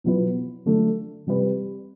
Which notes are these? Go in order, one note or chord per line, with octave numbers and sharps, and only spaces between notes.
B2 F#3 B3 E4 B4
D3 F#3 A3
C3 G3 C4 G4 B4